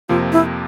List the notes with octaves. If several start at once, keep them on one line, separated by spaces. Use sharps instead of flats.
F2 C3 F3 A#3 F4
E4